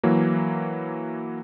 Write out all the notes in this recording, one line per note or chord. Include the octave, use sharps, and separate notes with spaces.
E3 F#3 A#3